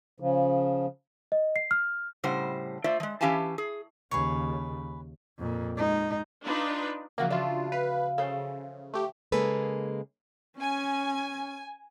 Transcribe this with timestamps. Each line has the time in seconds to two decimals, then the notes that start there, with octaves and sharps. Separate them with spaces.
0.20 C#3 F3
1.32 D#5
1.56 C7
1.71 F6
2.24 A2 C#3 G3 C5 F#5
2.84 A3 F4 C5 D5 E5
3.00 F3 G#3
3.21 E3 C#4 G4 F5 G#5 A5
3.58 G#4
4.11 D#2 C#3 G#4 B4 C#5
5.39 F2 A#2
5.76 G#3 D#4
6.45 D4 D#4 F4 B4
7.18 C#3 E3 F3 A#3 F#4
7.30 D4 F4 F#4 B4 E5
7.72 B4 F5
8.18 C#3 A4 C5
8.94 A3 G4
9.32 C#3 G#3 A#3 G#4 A4 B4
10.59 C#4 G#5